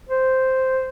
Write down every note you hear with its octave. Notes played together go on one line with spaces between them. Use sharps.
C5